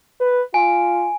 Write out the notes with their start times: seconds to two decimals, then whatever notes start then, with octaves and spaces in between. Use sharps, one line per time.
0.20 B4
0.54 F4 G#5